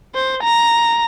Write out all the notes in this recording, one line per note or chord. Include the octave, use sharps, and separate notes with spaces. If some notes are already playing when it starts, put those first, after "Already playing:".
C5
A#5